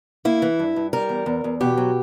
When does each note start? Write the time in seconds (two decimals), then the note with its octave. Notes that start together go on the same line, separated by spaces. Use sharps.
0.25 A#3 E4
0.42 E3
0.59 G2
0.76 G2
0.93 G3 A#4
1.09 E2
1.26 E2
1.44 E2
1.61 B2 G4
1.77 F#3